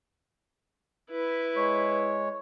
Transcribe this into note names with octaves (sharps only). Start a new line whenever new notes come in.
E4 B4
G#3 C#5